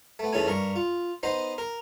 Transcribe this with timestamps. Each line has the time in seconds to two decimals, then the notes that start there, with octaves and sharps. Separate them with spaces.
0.19 A3 B3
0.33 D#2 E3 C#4 G#4 A4 G#5
0.47 G2 A#4 C#6
0.76 F4
1.23 B3 D#4 C5 D#5
1.58 A#4